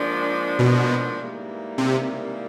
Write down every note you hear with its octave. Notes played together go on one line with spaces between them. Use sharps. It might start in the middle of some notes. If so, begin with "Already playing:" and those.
Already playing: G#2 F3 A#3 D4
B2
G#2 E3 G3 A#3 D#4
C3